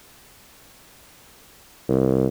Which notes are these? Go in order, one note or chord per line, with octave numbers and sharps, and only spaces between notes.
C2